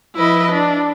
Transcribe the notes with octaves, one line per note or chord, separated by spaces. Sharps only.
F3 E4 B4 D#5
D4